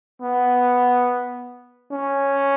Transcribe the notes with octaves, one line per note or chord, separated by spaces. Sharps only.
B3
C#4